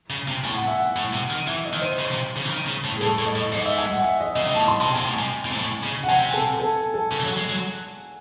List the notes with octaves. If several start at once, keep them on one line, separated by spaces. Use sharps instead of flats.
C#3
C3
A2 G#5
F#5
E5
F#5
A2
C3
D#3
E3 E5
D#5
D#3
C5
C#3
C3
C#3
E3
D#3
C#3
A2
G#4
A2 A4
A2
D#5
A2
G#2 D#5
E5
G#5
F#5
E5
D#5
C#3 D#5
C3
A2 A5
C6
C3 A5
C3 G#5
A2
C3
A2
C3
A2
C#3
F#5
C3 G#5
A4
A4
A4
C#3
E3
F#3
G#3
F#3